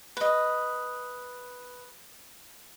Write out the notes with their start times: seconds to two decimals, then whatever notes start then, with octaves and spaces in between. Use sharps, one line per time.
0.17 B4 D#5